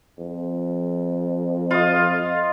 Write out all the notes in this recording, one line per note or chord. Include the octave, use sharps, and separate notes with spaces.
F2
F4 D#5